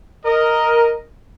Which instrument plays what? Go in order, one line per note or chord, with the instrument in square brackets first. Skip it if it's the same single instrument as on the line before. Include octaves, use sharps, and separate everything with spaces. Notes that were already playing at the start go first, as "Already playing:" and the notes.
[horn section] A#4 D#5